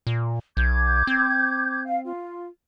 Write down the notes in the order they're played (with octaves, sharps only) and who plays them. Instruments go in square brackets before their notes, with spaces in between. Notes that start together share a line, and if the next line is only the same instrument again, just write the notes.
[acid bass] A#2
[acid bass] B1 [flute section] D6 G6 G#6
[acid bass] C4
[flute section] F5
F4